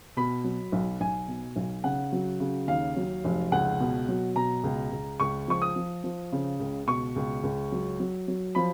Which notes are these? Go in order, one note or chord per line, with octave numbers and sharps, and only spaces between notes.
B2 B5
F#3
B1
B1 G#5
B2
B1
C#3 F#5
F#3
C#3
D#2 F5
F#3
F1
C#2 F#5
B2
F#3
B2 A#5
C#2
C#2
C#2 C#6
F3 C#6
D#6
F3
F3
C#3
C#2
B2 C#6
C#2
C#2
F#3
F#3
F#3
F3 B5